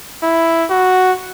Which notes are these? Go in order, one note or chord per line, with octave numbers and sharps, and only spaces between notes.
E4
F#4